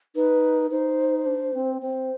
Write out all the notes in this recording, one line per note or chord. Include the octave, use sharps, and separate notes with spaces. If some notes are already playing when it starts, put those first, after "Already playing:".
D#4 B4
D#4 C5
D4
C4
C4 C5